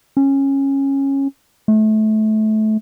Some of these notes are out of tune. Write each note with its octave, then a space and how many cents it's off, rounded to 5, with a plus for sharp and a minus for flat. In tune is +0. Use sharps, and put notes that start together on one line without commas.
C#4 -15
A3 -25